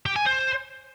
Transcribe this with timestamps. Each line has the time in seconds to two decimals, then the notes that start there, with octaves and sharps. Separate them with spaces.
0.06 G4
0.16 G#5
0.26 C5